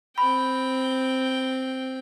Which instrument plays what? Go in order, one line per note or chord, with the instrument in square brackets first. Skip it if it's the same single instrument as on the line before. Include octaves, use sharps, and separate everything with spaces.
[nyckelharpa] C4 G5 [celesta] B5